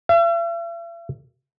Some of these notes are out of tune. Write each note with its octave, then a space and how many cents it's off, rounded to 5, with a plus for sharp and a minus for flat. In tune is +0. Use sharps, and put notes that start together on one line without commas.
E5 +45